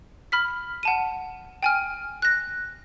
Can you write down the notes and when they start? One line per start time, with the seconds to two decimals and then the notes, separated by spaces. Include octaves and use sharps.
0.32 B5 F6 B6
0.83 F#5 A5 D#7
1.63 G5 G#5 F6
2.22 F#6 A#6